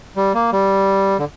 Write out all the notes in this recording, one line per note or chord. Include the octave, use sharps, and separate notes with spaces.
G3
A#3
G3
D3